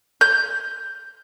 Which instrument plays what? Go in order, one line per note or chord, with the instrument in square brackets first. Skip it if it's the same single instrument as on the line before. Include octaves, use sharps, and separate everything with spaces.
[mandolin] G6